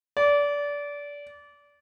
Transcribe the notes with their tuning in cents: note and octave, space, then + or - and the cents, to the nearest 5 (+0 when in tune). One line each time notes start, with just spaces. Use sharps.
D5 -25